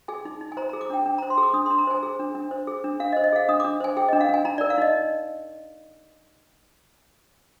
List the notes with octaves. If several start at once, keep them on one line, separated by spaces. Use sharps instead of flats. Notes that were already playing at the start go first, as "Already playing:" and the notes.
G#4 G#5
D#4
D#4
G#5
C5 A#5
G#4 A#5
D6
D4 G5
D4
C5 A#5
C6
G#4
D6
D4 D#6
D4 C6
A#5
C5 G#5
G#4
D4
D4
C5
G#4
D4
D4 F5
D#5
C5
D#5
G#4 F5
D4 D#6
D4 D6
C5 G#5
G#4 G5
D4 D#5
F5
D4 G#5
D#4 A#5
A#4 D5
F5
D#4 D#5